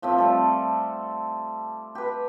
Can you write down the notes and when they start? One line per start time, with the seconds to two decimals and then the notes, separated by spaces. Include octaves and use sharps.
0.02 A2 F3 A3 C4
0.18 G3 A4
1.95 G4 B4